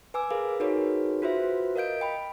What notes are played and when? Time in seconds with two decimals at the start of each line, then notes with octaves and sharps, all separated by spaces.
0.14 B4 G#5 D6 E6
0.30 G#4 A#4 B4 F5
0.60 D#4 F#4 G#4 A#4 B4 C#5
1.22 F4 F#4 B4 C5 E5
1.76 A#4 D#5 F5 G6 D7
2.01 G5 B5